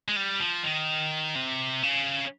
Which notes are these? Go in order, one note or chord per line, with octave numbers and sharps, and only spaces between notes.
G#3
G3
F3
D#3
C3
C#3